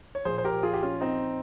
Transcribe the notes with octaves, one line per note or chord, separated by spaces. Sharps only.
C#5
A#2 F3 G#4 C5
C5
G4 A#4
F4 G#4
G4
C#4 F4
C4 D#4